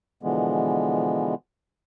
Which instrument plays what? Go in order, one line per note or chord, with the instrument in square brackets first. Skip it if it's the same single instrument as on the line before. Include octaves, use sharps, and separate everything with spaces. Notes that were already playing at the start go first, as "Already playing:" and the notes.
[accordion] B2 D3 E3 F3 G#3 B3